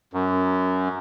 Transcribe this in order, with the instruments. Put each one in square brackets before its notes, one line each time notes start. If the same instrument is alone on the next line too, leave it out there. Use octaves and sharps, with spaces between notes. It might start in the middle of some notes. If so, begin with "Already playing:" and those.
[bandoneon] F#2